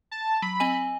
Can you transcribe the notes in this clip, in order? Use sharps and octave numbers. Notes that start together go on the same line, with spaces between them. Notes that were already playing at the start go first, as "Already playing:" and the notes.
A5
F#3 B5
C4 D#5 G#5 F#7